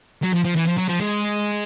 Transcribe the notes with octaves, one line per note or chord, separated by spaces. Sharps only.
F#3
F3
F3
E3
F3
F#3
F3
G#3